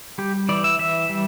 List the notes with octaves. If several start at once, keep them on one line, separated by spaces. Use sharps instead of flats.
G3 G4
E3 D5
E5
E3 E5
G3